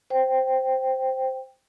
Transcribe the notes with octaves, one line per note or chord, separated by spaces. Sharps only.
C5 G5